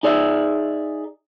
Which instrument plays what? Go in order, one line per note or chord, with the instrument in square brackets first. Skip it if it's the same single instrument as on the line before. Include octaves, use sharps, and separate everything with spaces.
[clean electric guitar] D#4 G#4 D5 E5